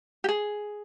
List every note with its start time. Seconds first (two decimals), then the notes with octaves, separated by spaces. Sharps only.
0.24 G4
0.29 G#4